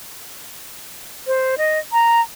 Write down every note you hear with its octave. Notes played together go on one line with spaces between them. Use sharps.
C5
D#5
A#5